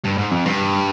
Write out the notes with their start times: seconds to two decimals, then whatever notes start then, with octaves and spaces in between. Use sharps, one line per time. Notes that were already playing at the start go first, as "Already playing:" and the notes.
0.04 G2
0.17 G#2
0.31 F2
0.45 G2